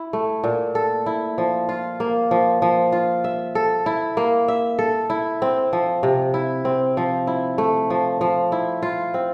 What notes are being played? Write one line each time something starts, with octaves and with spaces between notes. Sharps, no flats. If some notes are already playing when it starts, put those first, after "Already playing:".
Already playing: E4
A3
A#2
A4
E4
F3
F4
A#3
F3
F3
F4
E5
A4
E4
A#3
E5
A4
E4
C4
F3
C3
E4
C4
F3
E4
A3
F3
F3
E4
F4
C4